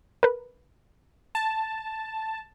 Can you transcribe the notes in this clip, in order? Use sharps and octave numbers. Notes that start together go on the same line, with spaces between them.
A#4 B4
A5